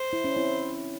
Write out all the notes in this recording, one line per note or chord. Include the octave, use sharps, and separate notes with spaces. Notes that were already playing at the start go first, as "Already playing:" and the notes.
Already playing: C5
E4
C#4
C4 E4